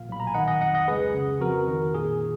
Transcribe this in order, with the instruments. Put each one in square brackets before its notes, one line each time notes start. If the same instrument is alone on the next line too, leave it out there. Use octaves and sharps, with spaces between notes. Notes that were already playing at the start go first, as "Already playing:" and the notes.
Already playing: [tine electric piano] A#1 A#2 F5
B1 B5
A#5
G#5
D#3 D#5 F#5
D#5 F#5
F2 D#5 F#5
D#5 F#5
C#2 G#4 B4
C#3
F2 F#4 A#4
D#3
A#2 G#4